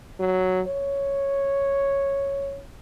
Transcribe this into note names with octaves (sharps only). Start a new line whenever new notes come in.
F#3
C#5